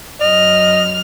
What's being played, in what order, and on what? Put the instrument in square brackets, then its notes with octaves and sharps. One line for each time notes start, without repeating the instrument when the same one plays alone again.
[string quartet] F#2 F6 [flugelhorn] D#5